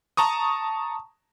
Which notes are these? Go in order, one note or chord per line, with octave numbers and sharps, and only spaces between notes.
A5 A#5 C#6 D#6